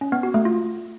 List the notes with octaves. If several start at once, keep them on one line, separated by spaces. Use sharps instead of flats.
C#4
B3
F#4
A3
F4